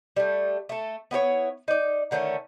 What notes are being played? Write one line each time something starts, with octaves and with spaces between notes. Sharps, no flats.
G3 A3
A3 A4
B3 E4 G4 C#5
D#4 D5
D3 D#3 A3 C#4